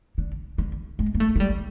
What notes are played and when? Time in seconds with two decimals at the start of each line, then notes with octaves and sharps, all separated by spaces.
0.18 D3
0.58 D3
0.99 G#3
1.14 A#3
1.20 A3
1.36 G#3
1.40 G3